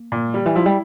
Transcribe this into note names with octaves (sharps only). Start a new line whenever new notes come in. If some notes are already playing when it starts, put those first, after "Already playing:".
Already playing: A#3
A#2
D3 G3
E3
F3 E4
G3